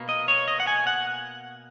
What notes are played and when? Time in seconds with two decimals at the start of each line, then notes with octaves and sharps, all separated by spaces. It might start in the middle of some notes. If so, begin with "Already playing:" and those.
Already playing: B2 A#3
0.09 D#5
0.28 C#5
0.48 D#5
0.60 F#5
0.67 G#5
0.87 F#5